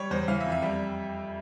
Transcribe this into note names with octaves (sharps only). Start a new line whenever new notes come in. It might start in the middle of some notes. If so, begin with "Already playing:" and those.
Already playing: G3 C#5
E2 C5
E3 F5
E5
F2
E5
G3